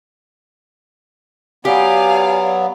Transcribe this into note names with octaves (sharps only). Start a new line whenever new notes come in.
F#3 B3 G4 D5 F5 G#5